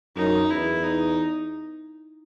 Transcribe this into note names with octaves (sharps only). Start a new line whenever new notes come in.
F#2 D#4
E2 E4
D#4